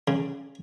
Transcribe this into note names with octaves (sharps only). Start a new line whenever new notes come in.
C#3